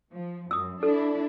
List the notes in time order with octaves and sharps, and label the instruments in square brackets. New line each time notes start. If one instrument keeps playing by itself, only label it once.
[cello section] F3
[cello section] F#2 [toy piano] D#6 E6
[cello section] D4 E4 [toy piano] A4